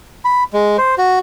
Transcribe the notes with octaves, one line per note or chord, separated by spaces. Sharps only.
B5
G#3
C5
F#4